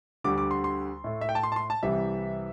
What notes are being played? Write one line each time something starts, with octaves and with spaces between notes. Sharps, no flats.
D2 D3 G3 D6
D6
C6
C6
A2 A3
E5
G5
A5
C6
A5
C6
A5
C2 C3 E3 G3 E5